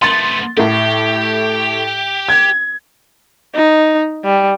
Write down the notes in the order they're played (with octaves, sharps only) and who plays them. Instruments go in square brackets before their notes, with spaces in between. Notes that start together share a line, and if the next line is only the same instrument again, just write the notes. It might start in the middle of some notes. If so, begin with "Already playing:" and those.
[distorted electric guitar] A3 B3 [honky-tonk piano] C6 A6
[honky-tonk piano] A2 A3 [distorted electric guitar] G4
[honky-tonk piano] G#6
[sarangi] D#4
G3